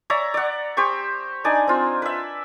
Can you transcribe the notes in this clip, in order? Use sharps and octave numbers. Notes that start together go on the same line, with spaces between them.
C#5 D5 E5 A#5
D5 F#5
G4 C5 C#6
D4 D#4 D5 G#5
C4 F4
B4 E5